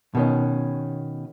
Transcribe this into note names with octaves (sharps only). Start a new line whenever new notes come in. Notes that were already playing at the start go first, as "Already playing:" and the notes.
B2 D#3 C#4